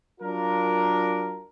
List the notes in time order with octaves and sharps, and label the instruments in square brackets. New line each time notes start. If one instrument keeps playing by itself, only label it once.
[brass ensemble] F#3 D4 F4 A#4